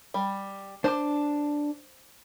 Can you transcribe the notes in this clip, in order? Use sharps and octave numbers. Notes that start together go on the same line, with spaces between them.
G3
D4 C5 A5 D6